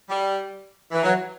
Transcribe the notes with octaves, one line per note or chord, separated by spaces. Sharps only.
G3
E3
F#3